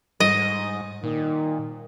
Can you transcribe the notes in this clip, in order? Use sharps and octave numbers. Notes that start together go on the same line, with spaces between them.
G#2 G3 D#5 D#6
A#2 D#3